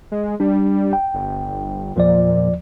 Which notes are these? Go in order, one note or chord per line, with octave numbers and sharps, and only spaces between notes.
G#3
G3 D4
G5
G1
E2 A#2 F3 D5